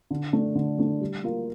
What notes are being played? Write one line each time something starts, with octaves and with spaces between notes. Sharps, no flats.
D3
A3 D4
D3
A3 D4
G3
A#3 F4 A#4 F5